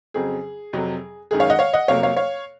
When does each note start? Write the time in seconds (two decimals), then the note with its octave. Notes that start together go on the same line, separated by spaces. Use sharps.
0.14 F2 C#3 F#3 C4 G#4
0.73 F2 C3 F#3
1.31 F#2 D#3 G#3 G#4
1.40 C#5 F5
1.50 D#5 F#5
1.59 C#5 F5
1.73 D#5 F#5
1.88 F2 C3 F#3 A#3 C#5 F5
2.03 C#5 F5
2.17 C#5 F5